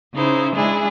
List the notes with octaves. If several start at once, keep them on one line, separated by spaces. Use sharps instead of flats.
C#3 D#4 E4 C5
G#3 D4 E4 G#4